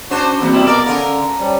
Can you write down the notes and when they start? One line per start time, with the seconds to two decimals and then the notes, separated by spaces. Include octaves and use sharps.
0.11 C#4 D4 F#4 C5 A5
0.40 E2 G#2 G3 A#3 C4 F#4
0.53 C3 G3 B3 E4 D#5 D#6
0.67 B2 A#4 D5 D6
0.86 D3 C#4 A#4 F5
1.40 G3 C5 C#5 A5